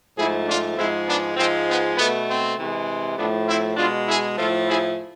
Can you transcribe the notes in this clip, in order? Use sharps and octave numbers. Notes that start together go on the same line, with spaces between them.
G#2 F3 A3 E4 G#4
D4 F4
G#2 F3 G#3 C4 E4
B3 D4
G#2 F3 G#3 C4
B3
B2 A3 B3
C4
C3 E3 G#3
A2 F3 A3 B3 D4
C4 E4
B2 G#3 D4 F4
E4 G#4
A2 F3 A3 F4 A4
E4 G#4